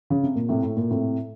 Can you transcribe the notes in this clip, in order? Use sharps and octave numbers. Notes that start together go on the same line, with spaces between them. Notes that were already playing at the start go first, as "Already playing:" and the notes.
C#3
C3
A#2
A2 C3
A2
A#2
A2 C3